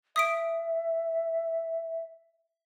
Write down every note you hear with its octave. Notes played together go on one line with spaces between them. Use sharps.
E5 D#6 B6 D7